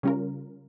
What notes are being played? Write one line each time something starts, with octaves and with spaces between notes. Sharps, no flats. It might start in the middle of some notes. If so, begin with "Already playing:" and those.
C#3 G3 C#4 F4 A#4